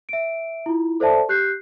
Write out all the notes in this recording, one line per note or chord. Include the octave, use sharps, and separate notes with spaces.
E5 D7
E4 F4
A4 C5 D5 E5 A5
G4 F#6 G6 C7